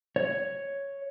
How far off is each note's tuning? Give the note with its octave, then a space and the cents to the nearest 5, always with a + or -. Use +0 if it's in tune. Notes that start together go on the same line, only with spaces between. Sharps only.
C#5 +0